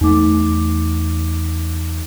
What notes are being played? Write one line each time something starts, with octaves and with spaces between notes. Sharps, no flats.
E2 A3 D#4 D6